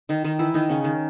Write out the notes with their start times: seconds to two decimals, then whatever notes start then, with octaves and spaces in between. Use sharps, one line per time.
0.09 D#3 D#4
0.24 D#3 D#4
0.39 E3 E4
0.54 D#3 D#4
0.69 C#3 C#4
0.84 D#3